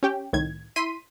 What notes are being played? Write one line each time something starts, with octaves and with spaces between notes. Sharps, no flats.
C#4 G4 G5
C2 A2 D#3 G#6
E4 C6 B6 D#7